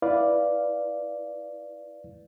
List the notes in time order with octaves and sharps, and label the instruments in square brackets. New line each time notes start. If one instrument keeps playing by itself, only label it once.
[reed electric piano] E4 B4 D5 F5